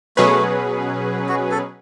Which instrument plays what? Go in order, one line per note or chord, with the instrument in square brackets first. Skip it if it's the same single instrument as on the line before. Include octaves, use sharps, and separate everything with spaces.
[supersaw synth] B2 F#3 C#4 G#4 B4 [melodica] A3
[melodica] F#4
A4